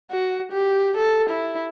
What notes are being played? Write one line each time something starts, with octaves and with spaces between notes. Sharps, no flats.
F#4
G4
A4
E4